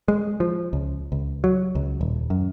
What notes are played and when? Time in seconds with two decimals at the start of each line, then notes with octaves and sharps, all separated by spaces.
0.08 G#3
0.40 F3
0.73 C#2
1.12 C#2
1.44 F#3
1.75 C#2
2.01 D#1
2.30 F#2